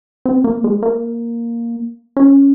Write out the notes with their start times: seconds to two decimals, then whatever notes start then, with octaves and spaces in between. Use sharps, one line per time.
0.26 C4
0.44 A#3
0.64 G#3
0.82 A#3
2.17 C#4